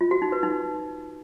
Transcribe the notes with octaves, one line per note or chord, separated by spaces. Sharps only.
F4
F#4
D#4
B4
D#4